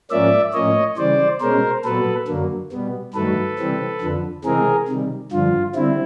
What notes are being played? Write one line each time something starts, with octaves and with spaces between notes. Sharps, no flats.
G#2 F3 A#3 C#4 D5 E5
A2 F3 A#3 C#4 C#5 D#5
C#3 E3 G3 C5 D5
B2 G#3 C#4 A#4 C5
A#2 F#3 B3 A4 B4
F#2 D3 F#3 A#3
B2 G3 B3
G2 D#3 F#3 A3 A4 B4
C3 E3 G3 C4
F2 D3 F3
C3 E3 G#3 C4 G#4 A#4
C3 D#3 G3
G2 D3 F3 F4
D3 G3 C4 E4